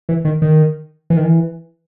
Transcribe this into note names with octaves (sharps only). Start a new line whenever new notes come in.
E3
D#3
D#3
E3
D#3
E3